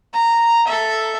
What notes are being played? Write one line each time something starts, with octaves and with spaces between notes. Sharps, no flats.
A#5
A4 E5